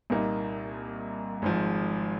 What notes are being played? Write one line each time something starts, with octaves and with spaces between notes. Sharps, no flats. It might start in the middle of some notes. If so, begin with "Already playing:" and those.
C2 A#2 A#3 D#4
G#1 G#2 F3